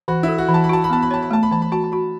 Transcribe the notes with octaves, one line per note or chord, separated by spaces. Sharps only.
E3 F#4
E4 A4
F#4
E3
A5
B5
F#4 A5
B5
B3 A5
B5
C#5 A5
B5
A3 A5
B5
E3 A5
B5
F#4 A5
A5
F#4 B5